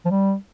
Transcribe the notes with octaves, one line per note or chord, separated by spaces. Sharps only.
F3
G3